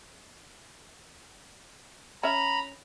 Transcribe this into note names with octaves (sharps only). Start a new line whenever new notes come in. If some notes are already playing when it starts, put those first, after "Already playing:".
C#4 E5 A#5 B5